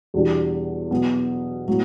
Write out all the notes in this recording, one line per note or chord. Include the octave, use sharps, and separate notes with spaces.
E2 B2 G3 D4 G4
B2 F#3 B3
A2 F#3 B3